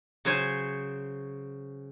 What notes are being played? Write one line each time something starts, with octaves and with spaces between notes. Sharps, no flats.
C#3 F#3 C5 C#5 G#5